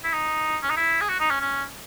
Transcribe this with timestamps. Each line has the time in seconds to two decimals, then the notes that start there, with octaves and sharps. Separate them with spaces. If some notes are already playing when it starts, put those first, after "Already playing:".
0.04 E4
0.13 D#4
0.63 C#4
0.70 D#4
0.77 E4
1.01 G#4
1.09 F#4
1.20 D#4
1.30 C#4
1.41 C#4